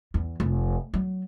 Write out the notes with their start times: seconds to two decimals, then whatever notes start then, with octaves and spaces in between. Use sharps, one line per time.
0.14 E2
0.40 F1
0.94 F#3